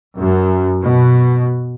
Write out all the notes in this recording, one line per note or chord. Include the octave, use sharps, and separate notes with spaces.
F#2
B2